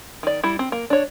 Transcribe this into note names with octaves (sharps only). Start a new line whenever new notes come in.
D#3 D5
G3 E4
C4
A#3
D4 C#5